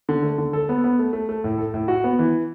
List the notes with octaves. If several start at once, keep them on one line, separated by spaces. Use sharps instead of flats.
D3
A3
D3
A4
B3
B3
A3
A3
A3
A2
A4
A2
F#4
B3
E3